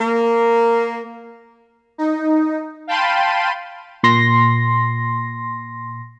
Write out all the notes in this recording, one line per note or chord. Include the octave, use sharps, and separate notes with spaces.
A#3
D#4
F5 G5 A5 B5 C6 D#7
A#2 C6 A#6